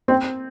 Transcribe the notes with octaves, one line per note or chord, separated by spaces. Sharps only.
C4